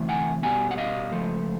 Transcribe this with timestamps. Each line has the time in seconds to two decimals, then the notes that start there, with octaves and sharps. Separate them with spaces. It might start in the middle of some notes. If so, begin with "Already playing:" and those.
Already playing: D2 C3 E3 A3
0.09 F#5 G#5
0.43 B2 G3 B3 F#5 G#5
0.71 F#5
0.77 D#5 F5
1.12 C#2 C#3 F3 A3